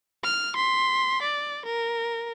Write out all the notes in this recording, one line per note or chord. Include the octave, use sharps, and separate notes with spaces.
F6
C6 B6
D5
A#4